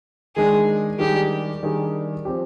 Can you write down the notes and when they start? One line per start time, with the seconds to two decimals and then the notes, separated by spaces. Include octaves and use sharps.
0.36 D#3 G#3 D4 G#4
0.99 D#3 G3 D4 G4 G#4
1.63 D#3 G3 D4 G#4
2.25 F3 C4 G4